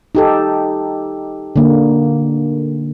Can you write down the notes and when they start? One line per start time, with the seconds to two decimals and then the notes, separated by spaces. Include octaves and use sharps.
0.15 D#4 G4 A4
1.56 D3 A#3